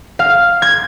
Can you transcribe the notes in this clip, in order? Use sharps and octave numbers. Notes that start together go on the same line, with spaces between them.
F5
G#6